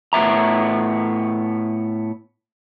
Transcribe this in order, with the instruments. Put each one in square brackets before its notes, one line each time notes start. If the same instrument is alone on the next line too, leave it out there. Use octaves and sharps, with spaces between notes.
[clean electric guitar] A2 B3 E5 A#5